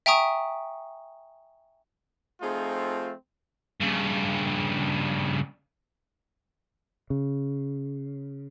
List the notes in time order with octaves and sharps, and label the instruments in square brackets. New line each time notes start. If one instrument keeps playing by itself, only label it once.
[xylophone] E5 G5 G#5 A#5 C#6 D#6
[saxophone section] F3 D#4 G#4 [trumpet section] A3 C4 F4
[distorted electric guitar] G2 C#3
[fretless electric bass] C#3